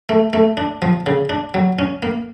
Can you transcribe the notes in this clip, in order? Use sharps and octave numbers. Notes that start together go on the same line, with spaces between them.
A3
A3
D4
F3
C#3
D4
F#3
C#4
A#3